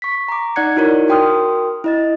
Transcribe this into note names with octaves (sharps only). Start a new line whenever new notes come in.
C#6 B6
A#5 D6
D#4 D5 F#5 F#6 G#6 C#7
D#4 E4 F#4 A#4 C#5 D5
F#4 A#4 G5 C6 D#6 F6
E4 D#5 A6